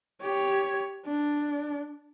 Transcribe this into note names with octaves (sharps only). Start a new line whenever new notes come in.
G4 C#5
D4